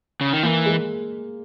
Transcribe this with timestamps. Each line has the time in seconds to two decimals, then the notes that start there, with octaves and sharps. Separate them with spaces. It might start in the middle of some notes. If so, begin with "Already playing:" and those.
0.21 C#3
0.33 D#3
0.43 E3 A#3
0.66 G#3